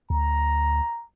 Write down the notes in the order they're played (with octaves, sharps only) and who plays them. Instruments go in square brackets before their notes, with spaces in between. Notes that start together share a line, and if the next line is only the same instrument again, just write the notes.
[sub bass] D2 [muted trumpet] A#5